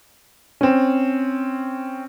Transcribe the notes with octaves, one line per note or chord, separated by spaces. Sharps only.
C4 C#4